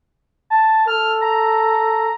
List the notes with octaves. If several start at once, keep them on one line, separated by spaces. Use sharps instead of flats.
A5
A4 F6
A#5